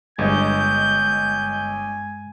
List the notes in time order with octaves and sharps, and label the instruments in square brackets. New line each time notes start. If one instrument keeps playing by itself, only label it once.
[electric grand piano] G1 D#5 [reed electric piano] G2 G#3 [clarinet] G#5 [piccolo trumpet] G6